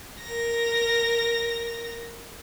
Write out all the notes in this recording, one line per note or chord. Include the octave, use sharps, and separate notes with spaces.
A#4 A#6